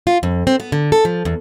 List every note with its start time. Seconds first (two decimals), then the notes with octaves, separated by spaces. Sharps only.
0.07 F4
0.23 F2
0.47 C4
0.60 B3
0.72 D3
0.92 A4
1.05 F3
1.25 E2